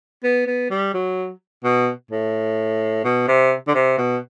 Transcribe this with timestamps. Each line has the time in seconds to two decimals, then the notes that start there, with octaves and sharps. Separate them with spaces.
0.23 B3
0.47 B3
0.70 G3
0.94 F#3
1.64 B2
2.11 A2
3.04 B2
3.28 C3
3.68 D3
3.75 C3
3.98 B2